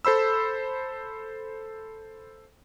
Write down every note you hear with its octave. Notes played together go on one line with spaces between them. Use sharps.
A4 C5 B5 E6